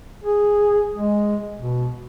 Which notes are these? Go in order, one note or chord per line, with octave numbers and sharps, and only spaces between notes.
G#4
G#3
B2